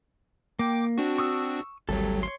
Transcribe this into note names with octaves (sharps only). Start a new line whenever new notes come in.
A#3 G5 D6
C4 D4 F#4
C#6 D#6 E6
G#1 D2 F#3 G3 A4
C#5 C6